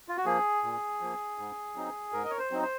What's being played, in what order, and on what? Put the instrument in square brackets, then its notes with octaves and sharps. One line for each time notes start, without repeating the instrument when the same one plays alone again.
[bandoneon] F4
F#4
F3 A#3 G#4
A#2
F3 A#3
G#2
F#3 C4 D#4
G#2 A#4
D#5
C#5
C5
F#3 C4 D#4
C5